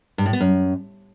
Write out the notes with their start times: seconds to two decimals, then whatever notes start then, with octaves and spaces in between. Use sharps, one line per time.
0.18 G2
0.26 A2
0.33 B3
0.40 F#2